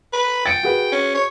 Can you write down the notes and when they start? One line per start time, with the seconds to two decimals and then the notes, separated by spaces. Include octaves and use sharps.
0.13 B4
0.46 G5 A6 C#7 D7
0.63 F#4 G#4 B4
0.92 C#4
1.14 C#5